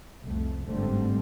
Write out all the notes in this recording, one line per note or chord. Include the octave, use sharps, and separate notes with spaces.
C2 F2 A3
G1 G#2 D3 G3 A3 C4